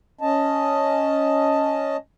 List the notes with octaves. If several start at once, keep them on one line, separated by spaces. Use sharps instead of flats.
C#4 D#5 A5